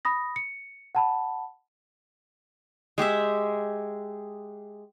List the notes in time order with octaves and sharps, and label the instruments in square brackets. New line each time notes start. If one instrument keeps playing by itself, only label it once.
[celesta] B5 D#6 A#6
C#7
F#5 A5 B5
[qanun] G#3 G4 G#4 E5